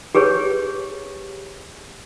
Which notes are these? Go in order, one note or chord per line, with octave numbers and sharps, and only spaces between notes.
G4 G#4 B4 C#5